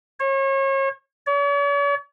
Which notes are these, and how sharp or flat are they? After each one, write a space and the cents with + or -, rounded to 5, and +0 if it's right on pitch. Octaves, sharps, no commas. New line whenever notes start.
C#5 -35
C#5 +45